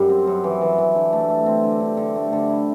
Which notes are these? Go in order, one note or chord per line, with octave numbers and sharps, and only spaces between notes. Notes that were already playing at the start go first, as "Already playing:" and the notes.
Already playing: F#2 G3
C4
F#2
E3
E3
E3
D3
A3
A3
C4
D3
D3
D3
A3
D3
E4